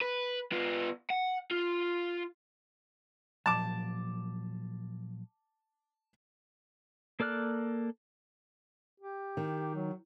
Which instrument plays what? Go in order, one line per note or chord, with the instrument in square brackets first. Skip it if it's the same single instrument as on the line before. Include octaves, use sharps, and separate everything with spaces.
[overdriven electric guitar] B4
B3 F4
F#5
F4
[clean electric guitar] A#2 F3 F#3 [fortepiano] A5 D6
[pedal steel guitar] A#3 A4 D5 F6 F#6
[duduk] G4
[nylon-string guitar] D#3
[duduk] F#3